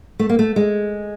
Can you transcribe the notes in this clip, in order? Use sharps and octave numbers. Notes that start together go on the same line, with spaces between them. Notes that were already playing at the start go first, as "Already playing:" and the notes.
A3
A#3
A3
G#3